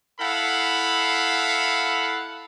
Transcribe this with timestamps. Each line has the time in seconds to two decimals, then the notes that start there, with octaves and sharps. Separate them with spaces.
0.20 E4 A4 F5 F#5 B5